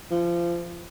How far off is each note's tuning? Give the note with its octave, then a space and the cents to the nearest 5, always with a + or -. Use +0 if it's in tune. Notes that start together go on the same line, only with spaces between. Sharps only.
F3 -25